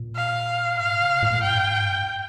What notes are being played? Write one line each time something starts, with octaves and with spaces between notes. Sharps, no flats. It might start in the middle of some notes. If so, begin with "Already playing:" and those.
Already playing: A#2
F5
G#2 F5
C#3
C3
A#2
G#2
G2 G5
G#2
G2